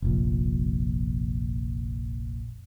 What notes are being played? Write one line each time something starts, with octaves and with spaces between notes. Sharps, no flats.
F1 A#1